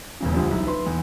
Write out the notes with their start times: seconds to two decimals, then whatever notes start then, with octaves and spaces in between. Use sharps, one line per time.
0.20 E1 E2 C#3
0.34 D2 D3 F3 G3
0.50 B1 E4
0.67 B4 C6
0.87 E2